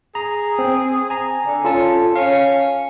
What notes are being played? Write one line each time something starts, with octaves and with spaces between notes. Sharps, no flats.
G#4 A#5
C4
G#5 A#5
D3
C#4 F4 A4 A5
C#4 F5